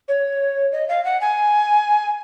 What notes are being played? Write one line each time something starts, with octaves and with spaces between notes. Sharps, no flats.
C#5
D#5
F5
F#5
G#5